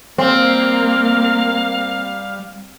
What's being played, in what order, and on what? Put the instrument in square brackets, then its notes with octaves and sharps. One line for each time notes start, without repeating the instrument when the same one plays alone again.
[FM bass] G3 [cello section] A#3 [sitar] C4 [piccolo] F5